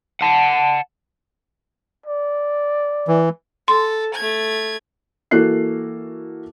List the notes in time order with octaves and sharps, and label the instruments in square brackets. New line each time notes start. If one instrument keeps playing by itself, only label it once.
[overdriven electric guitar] F#5 A5
[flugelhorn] D5
[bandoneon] E3
[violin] A4 [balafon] C6
[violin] A3 G#6
[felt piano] E3 A#3 F#4 A4 F#6 C7